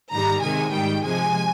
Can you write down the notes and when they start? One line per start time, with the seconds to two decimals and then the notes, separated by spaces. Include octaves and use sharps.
0.12 G#2 D#3 G3 A#5
0.42 C3 D#3 G#3 G#5
0.72 G#2 D#3 G3 G5
1.03 C3 F3 G#3 G#5